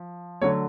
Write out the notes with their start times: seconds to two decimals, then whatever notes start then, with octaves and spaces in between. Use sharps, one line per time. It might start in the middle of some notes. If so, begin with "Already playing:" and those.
Already playing: F3
0.41 D3 F#3 A3 C#5